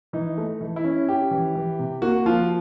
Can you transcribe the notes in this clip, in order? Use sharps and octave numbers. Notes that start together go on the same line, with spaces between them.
E3 D#4
A3
E3
E4
C#4
C#4 G4
E3
E3
C3
A#3 F#4
F3 F4